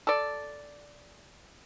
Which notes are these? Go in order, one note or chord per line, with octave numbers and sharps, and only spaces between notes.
A4 D5